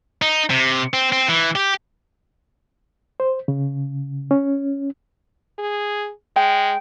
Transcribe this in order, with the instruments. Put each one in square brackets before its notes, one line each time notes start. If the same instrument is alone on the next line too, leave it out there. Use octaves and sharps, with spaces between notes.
[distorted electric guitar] D#4
C3
C4
C4
E3
G4
[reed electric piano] C5
C#3
C#4
[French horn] G#4
[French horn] G#3 [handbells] G5